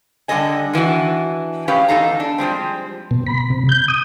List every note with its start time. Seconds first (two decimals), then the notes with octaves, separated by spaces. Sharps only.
0.28 D3 G3 G#4 A4 D#5 G#5
0.73 D#3 E3 D4 F#4
1.68 F2 G#3 C#4 G4 B4 F5
1.88 E2 A#2 D#4 A4 F5 A#5
2.20 D4
2.38 F3 G3 G#3 C4
3.11 B2
3.27 B5
3.50 C3
3.69 G6
3.88 D#6